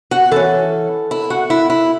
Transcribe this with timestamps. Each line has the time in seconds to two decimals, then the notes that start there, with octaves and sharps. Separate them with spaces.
0.11 F#4
0.31 E3 C#4 A4
1.11 E4
1.30 F#4
1.50 E4
1.70 E4